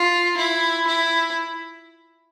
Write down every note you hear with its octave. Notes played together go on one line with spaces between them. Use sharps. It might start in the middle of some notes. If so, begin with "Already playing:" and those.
Already playing: F4
E4
E4